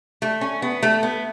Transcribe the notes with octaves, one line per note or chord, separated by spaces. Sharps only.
A3
C#4
B3
A3
B3